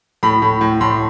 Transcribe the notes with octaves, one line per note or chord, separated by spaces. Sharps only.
A2 B5
A2
A2
A2 C6